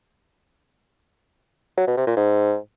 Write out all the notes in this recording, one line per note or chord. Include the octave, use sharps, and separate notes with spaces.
F#3
B2
C3
A#2
G#2